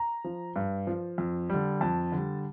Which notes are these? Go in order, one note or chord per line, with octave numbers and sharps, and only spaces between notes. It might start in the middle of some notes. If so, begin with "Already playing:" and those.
Already playing: A#5
F3
G2
F3
F2
D3 G3
F2 A5
D3 G3